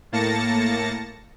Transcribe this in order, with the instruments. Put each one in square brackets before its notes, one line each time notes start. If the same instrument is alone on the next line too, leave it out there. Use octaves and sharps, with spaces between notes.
[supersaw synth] A2 A#3 A5 A6 A#6 C#7